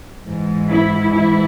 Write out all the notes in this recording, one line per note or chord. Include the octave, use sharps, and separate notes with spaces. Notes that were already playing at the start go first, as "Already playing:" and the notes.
G#2 E3
E4
E4